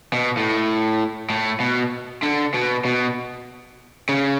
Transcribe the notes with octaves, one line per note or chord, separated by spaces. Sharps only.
B2
A2
A2
B2
D3
B2
B2
C#3